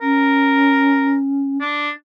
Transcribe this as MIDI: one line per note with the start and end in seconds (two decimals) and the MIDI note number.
0.01 1.58 61
0.01 1.14 70
1.61 1.90 62